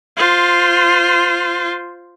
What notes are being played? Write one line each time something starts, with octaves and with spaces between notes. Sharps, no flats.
F4 C5